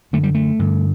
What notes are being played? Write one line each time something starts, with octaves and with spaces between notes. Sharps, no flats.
F#2 D3 A3
G3
A3
G2 D3